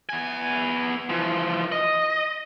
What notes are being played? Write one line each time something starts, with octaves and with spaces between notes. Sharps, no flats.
B3 G#5
E3 F3
D#5